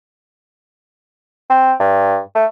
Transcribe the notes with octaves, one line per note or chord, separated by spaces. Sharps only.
C4
G2
A3